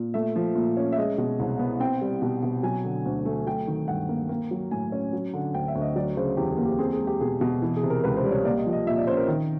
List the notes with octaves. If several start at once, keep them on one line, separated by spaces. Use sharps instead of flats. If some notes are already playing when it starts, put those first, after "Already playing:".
Already playing: A#2
A3 E5
F3
A#2
C#4
E5
G#3 D#5
B2
C2
B3
C4 G5
G3
B2
B2
F#3 G#5
D3
D2
A3
F#3 G5
D#3
G2 F#5
A#3
A#3
F#3
A2 G#5
C#4
F#3
D3
D2 G5
E5
D2
D#5
F#3 D5
C#3 C5
E2 G4
G#4
A#3
G4
C4 G#4
G#4
G#3
G4
B2 G#4
B2
E3
G#4
C3
A#4
C#2 B4
C5
G3
C#5
A#3 D5
D#5
F3
D#5
A#2 E5
D5
C#4 C5
A#4
D#3